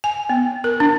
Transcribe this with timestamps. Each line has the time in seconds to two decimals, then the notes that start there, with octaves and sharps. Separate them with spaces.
0.04 G#5
0.29 B3
0.64 A#4
0.80 D4